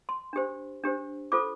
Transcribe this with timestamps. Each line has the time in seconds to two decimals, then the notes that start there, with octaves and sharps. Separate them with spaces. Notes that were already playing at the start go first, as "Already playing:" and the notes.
0.09 C6
0.33 D4 G4 C5
0.83 D4 G4 C5
1.32 F4 A4 C5 D6